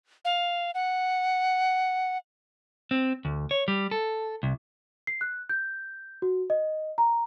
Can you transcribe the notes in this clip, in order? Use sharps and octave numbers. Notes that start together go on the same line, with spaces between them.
F5
F#5
C4
D2
C#5
G3
A4
C2
C7
F#6
G6
F#4
D#5
A#5